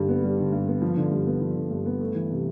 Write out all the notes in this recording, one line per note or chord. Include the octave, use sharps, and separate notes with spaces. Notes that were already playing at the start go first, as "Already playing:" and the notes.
Already playing: G2 D3 G3
B3
G3
D3
G2
B3
F3
D3
G2
B3
F3
D3
G2
B3
A3
E3
C3